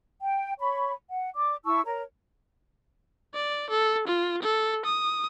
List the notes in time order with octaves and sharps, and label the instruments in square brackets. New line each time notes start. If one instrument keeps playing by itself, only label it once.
[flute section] G5
C#5 B5 C#6
F#5
D5 D6
E4 A5 C#6 E6
A#4 C#5 A#5
[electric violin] D5
A4
F4
A4
D#6